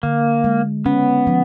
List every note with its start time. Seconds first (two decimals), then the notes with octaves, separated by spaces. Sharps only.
0.03 D3 A#3
0.44 G#3
0.86 B3 C#4
1.27 F3